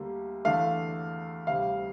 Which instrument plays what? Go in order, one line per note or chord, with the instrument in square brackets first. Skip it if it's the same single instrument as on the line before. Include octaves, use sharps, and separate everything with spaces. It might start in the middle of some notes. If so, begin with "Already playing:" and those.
Already playing: [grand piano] D2 D3 G3 A#3
E2 D3 A3 D4 F5
D2 C3 G3 F5